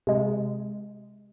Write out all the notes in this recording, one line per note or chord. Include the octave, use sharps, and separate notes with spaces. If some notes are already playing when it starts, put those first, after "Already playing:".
C3 G#3